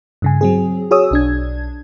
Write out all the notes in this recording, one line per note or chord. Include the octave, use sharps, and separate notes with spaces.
G2 C#3 G#5
F#3 C4 G#4
F#4 G#4 C#5 D#6 E6
B1 D4 G#6